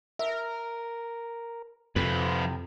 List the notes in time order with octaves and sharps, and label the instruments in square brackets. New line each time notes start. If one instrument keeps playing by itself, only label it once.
[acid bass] A#4 [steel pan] E5
[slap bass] F2 [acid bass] C3 [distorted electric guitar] F3 B4